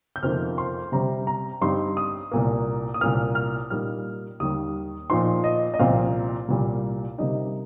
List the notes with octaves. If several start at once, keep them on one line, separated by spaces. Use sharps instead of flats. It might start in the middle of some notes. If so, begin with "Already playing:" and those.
G6
F2 C3 F3 A#3 D#4 F6
C6
C3 G3 C4 A#5
A#5
G2 G3 C4 D#4 C6
D#6
C2 A#2 A#3
D#6
C2 A#2 A#3 F6
F6
A#2 G3 A#3 D#4 F6
D#2 D#3 G3 D#6
A#2 F3 D#4 C6
D#5
D#5
C2 A#2 F3 C4 F5
C2 A#2 G3 A#3
C3 G3 A#3 D#4 D#5